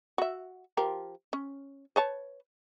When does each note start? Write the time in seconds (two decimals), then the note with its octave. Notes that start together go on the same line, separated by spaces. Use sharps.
0.18 F#4 E5
0.77 F3 G4 A#4
1.33 C#4
1.96 B4 C#5 A5